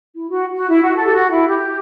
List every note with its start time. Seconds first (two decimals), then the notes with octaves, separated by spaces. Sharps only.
0.15 E4
0.29 F#4
0.55 F#4
0.68 E4
0.81 F#4
0.96 A4
1.04 G4
1.13 F#4
1.31 E4
1.48 G4